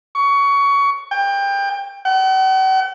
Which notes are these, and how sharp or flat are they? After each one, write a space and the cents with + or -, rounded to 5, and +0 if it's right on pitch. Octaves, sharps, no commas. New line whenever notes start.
C#6 +20
G5 +25
F#5 +45